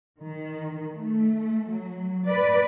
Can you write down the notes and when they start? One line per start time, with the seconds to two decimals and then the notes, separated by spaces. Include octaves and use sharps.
0.21 D#3
0.96 A3
1.70 F#3
2.27 B4 D5